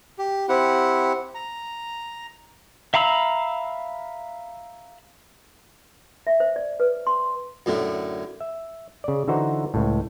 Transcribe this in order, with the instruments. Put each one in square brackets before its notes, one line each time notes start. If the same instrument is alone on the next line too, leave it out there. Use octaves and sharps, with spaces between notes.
[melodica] G4
C4 E4 G4 F#5
A#5
[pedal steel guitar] E5 F5 A#5 B5 E6
[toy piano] E5
C5
D5
B4
C6
[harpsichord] F#2 A2 D3
[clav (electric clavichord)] E5
C#3 D5
D3 E3 D#4 F#4 C5 A#5
C#2 A2